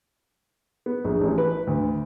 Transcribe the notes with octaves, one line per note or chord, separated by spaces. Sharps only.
B3
A#1
A1
B4
D2